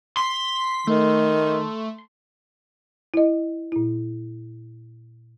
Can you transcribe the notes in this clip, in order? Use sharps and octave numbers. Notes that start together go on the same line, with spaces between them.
C6 B6
D#3 A3
E4 D#5
A#2 E4